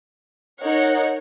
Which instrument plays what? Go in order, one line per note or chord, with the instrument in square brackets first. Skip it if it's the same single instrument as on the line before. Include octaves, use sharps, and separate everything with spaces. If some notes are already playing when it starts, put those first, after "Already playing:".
[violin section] D#4 A#4 C#5 F#5